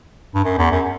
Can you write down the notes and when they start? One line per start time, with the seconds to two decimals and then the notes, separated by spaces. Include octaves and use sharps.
0.35 G2
0.44 F#2
0.58 E2
0.72 F#2